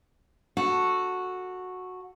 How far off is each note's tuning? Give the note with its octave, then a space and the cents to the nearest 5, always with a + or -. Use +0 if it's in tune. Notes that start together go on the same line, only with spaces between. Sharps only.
F#4 -10 A4 +10